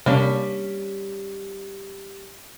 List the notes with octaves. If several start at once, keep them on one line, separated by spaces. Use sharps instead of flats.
C3 G3 A#3 C#4 D4